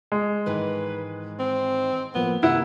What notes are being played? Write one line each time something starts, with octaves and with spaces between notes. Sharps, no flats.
G#3
G#2 D#3 E3 B4
C4
A2 F3 A#3 B3
C3 D#3 A#3 E4 F#5